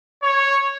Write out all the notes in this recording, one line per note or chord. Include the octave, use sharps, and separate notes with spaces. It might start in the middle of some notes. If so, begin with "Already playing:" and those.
C#5